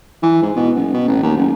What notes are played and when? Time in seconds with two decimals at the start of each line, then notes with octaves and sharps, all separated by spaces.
0.23 E3
0.43 G#2
0.56 B2
0.75 F#1
0.94 B2
1.08 A1
1.23 D#2
1.37 F#1